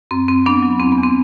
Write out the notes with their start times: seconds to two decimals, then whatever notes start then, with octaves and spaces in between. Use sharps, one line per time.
0.11 F#2 C4
0.28 F#2 C4
0.46 F#3 B3 D4
0.62 F#3
0.80 E2 C4
0.92 B3
0.98 E2
1.03 C4